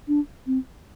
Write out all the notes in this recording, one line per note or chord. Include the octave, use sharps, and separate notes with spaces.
D4
C4